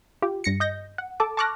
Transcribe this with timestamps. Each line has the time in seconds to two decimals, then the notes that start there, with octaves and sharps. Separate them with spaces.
0.22 F4 G4
0.44 G2 A#6 C#7
0.60 D#5 G6 A#6
0.98 F#5
1.20 A4 A5 D6
1.37 A5 C#6 D6 F6 F#6 A#6